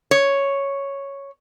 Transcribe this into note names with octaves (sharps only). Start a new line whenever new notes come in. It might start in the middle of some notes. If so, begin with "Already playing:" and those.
C#5